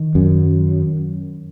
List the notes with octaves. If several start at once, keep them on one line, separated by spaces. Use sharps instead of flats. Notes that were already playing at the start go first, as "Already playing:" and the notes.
Already playing: D#3
F#2